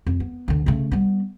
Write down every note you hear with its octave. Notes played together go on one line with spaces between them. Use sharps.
F2
B3
D2 D3
C#3 A3
G3 B3